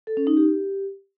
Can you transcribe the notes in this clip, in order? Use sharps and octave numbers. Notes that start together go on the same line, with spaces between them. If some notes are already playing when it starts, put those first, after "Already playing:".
A4
C#4
D#4
G4